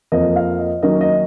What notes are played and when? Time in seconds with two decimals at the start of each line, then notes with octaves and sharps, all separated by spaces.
0.12 F2 F3 A#3 D#5
0.36 F5
0.59 D#5
0.83 D#3 F#3 A#3 C#4 D#5
1.01 D#5